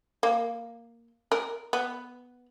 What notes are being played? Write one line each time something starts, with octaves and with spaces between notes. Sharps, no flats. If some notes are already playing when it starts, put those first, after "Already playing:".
A#3
A#4
B3